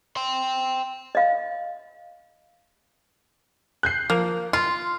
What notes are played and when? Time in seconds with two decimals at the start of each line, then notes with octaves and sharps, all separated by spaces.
0.16 G5 C6
1.15 D#5 F5
3.83 F#6 G6 C7
4.10 F3 A#3
4.53 F4 C6